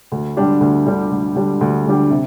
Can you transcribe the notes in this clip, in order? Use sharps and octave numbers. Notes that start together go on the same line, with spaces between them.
D2
D3 G3 D4 G4
D2
D3 G3 D4 G4
D2
D3 G3 D4 G4
D2
D3 G3 D4 G4
C3